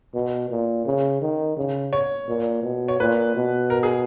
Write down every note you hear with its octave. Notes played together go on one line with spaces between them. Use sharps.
B2
A#2
C#3
D#3
C#3
C#5
A#2
B2
C#5
A#2 B4
B2
A#4
G#4